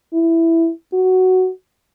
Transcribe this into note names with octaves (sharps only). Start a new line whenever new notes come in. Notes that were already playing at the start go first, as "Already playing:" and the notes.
E4
F#4